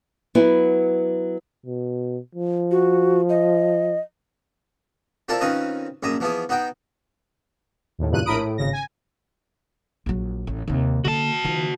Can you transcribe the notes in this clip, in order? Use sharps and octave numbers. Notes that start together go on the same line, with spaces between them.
F#3 B3 E4
B2
F3
F#4
D#5
C4 E4 F4 A4 A#4 D5
D#3 C4 C#4 F4 B4 D#5
A#1 F#2 E5 A#5 D#6
E3 F3 B3 E4 G#4
B3 D#4 F#4 G5
D#2 A2
E2 G2 A#2 C#3 F#6 D#7
A#1 A2 A#4 B5 D#6 D7
A2
G#1 C#3 A#6
G#5
A#1 F#3
A1
D#2 C3
D3 A#3 F#4 A5
D#3 F3